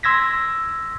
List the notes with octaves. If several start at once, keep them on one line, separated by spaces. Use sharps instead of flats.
C6 E6 G#6 A#6 B6